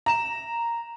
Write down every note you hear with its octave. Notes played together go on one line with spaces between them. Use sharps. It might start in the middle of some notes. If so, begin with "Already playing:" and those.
A#5 E7